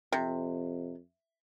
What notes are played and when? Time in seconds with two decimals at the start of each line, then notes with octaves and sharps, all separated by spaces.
0.12 F2 C3